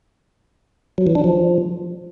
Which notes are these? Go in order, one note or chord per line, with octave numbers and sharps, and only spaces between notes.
F#3
E3
D4
F3